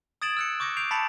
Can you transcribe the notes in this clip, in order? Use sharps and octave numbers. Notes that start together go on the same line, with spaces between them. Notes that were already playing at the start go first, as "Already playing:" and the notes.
D#6 G#6 A6 D7 E7 F#7
E6 F#6 C#7
C#6 D6 G6 A#6 C#7
G6 C7 D7 F7
A5 B5 A6 B6 C#7 F7